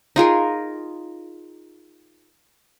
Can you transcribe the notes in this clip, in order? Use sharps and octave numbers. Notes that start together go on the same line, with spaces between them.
D#4 F4 G#4 A#4